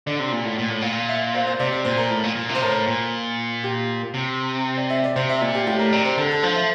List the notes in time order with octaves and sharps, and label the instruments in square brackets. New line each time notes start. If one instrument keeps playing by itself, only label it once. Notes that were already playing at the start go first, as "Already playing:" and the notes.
[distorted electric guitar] D3 [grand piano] D5
[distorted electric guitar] C3
A#2
A2
A#2
A2
A#2
[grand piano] E5
C5
C5
[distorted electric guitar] C3 [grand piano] D5
[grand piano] D5
[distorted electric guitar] A#2 [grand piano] C5
[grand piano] A#4
[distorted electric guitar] A2
A#2
A#2
C3
[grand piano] C5
[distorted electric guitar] A2 [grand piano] A#4
[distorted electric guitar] A#2
[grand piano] G4
[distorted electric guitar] C3
[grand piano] D5
E5
D5
[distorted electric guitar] C3 [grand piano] C5
[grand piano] E5
[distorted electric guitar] A#2 [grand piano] D5
[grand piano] G4
[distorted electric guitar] A2 [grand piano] G4
[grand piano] A#4
[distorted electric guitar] C3 [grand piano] D5
[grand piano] C5
[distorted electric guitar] D3 [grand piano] A4
[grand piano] A4
[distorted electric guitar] F3 [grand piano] C5
[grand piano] E5